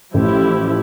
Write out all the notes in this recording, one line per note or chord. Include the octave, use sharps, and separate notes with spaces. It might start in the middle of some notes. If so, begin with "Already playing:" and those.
A1 A2 F3 A3 E4 G4